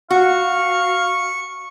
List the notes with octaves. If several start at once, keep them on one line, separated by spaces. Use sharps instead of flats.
F#4 F5 C#6